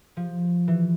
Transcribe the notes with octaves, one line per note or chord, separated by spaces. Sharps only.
F3
E3